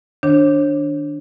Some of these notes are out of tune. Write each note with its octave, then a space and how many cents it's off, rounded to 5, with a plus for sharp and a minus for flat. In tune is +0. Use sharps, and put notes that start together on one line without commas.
D#3 +0 D4 -5 C#5 -40